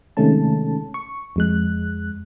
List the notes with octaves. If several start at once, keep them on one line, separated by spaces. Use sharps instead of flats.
C3 D#3 G#3 A3 C#4 A5
C#6
F2 G#3 F#6